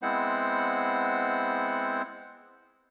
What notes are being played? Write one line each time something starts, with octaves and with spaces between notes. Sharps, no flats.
G#3 B3 C4 E4 C5 F#5